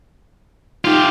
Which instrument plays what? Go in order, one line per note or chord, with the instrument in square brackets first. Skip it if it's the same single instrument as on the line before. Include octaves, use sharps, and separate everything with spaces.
[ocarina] D#4 [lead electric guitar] F4 G4